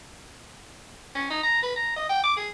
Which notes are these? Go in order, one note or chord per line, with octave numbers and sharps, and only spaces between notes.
C#4
D#4
A#5
B4
A#5
D#5
G5
D6
G#4